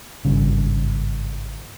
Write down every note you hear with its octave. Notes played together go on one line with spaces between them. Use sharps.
G#1 G2 C#3